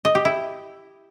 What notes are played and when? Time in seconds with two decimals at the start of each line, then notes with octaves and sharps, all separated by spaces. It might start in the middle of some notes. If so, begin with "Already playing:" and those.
0.05 D#5
0.15 G4
0.25 E4